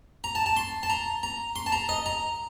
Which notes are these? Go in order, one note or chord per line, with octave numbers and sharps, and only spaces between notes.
A#5
A5
A5
C6
A5
A#5
A#5
C6
A5
A#5
D#5
A#5